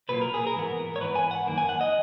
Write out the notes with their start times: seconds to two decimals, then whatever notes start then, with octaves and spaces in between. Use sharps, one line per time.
0.09 B1 A#2 F#3 A#3 B4
0.21 A#4
0.34 G#4
0.47 A#4
0.55 G#2 E3 B3
0.96 C#5
1.00 G#2 E3 B3 B4
1.15 G#5
1.31 F#5
1.46 F#2 D#3 A#3
1.58 G#5
1.69 F#5
1.81 D#5